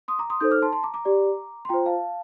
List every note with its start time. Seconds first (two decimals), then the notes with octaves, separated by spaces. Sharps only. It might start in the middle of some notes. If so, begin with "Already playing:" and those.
0.08 C6 D#6
0.19 A#5 D6
0.30 C6 D#6
0.40 D#4 A4 C5 D#6 G6
0.51 D6 F6
0.62 A5 C6
0.73 A5 C6
0.83 A#5 D6
0.94 A#5 D6
1.05 G4 D5
1.65 C6
1.69 F4 C5 G5 A#5
1.86 F5 A5